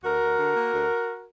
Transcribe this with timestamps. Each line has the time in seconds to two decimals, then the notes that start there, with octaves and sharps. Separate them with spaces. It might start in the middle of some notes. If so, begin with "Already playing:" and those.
0.03 D2 F#4 A#4
0.21 D2
0.38 D3
0.55 A#3
0.72 D2